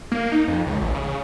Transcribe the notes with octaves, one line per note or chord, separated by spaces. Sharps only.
A#3
D#4
F2
C#2
A1
C#3